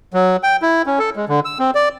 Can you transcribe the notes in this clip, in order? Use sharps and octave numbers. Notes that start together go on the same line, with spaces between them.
F#3
G5
E4
C#4
A4
G#3
D3
E6
C4
D5